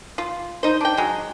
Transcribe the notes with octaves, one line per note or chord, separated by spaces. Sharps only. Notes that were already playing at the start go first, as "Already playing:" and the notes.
F4
D#4 C5
D4 G5
F#3 G#3